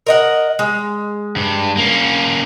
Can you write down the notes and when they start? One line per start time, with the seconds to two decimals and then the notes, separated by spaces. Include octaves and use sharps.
0.07 A#4 D#5 F#5
0.59 G#3
1.36 G2
1.77 A#3 C#4